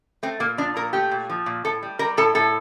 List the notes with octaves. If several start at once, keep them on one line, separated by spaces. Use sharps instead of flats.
A3 C4
A#2 A#3
F3 D4
A#2 A#4
A3 G4
A#2
F3
A#2
A2 A4
G3
G3 A#4
A2 A4
A2 A4